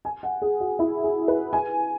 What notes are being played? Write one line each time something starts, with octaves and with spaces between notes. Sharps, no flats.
G#5
F#5
G#4
F#4
E4
G#4
B4
G#5